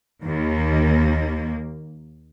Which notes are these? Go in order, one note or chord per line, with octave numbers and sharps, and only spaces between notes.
D#2 D#3 A#3